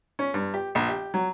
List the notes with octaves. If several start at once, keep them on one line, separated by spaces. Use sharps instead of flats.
C#4
G2
G4
A#1
G4
F#3